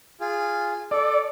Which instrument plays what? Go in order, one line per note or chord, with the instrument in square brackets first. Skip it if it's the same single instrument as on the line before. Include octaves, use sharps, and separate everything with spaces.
[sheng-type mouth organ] F4 G#4
[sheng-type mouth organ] A4 [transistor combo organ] D5